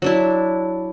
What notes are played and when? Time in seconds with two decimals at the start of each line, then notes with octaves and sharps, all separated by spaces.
0.02 F#3 D4 E4